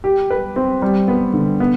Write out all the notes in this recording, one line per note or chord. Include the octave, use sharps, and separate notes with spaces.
G4
B4
C4
G3
B3
D3
B3